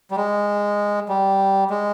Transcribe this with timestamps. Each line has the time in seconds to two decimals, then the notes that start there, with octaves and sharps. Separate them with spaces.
0.11 G3
0.16 G#3
1.09 G3
1.70 G#3